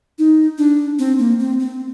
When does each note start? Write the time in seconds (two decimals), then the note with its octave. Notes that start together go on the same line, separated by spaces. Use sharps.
0.19 D#4
0.58 D4
0.99 C4
1.19 A#3
1.40 C4
1.60 C4